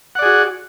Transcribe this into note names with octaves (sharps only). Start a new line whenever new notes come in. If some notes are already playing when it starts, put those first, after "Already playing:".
F#4 G#4 D5 F#5